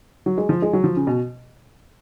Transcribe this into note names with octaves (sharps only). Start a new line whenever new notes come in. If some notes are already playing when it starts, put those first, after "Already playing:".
F#3
G#3
F3
G#3
F#3
F3
C#3
B2